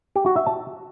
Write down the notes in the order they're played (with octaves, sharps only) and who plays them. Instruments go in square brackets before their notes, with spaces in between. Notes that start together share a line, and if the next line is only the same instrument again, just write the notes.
[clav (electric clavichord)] G4
F#4
E5
A5